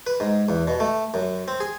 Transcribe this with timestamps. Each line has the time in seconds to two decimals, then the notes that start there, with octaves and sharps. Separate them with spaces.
0.07 B4
0.20 G#2
0.49 E2
0.68 B2
0.80 A3
1.14 F#2
1.48 C4
1.60 G#4